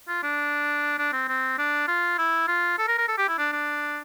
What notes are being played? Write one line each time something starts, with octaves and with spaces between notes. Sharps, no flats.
F4
D4
D4
C4
C4
D4
F4
E4
F4
A4
A#4
A#4
A4
G4
E4
D4
D4